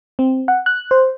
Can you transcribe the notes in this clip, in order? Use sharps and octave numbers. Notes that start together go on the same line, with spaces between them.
C4
F#5
F#6
C5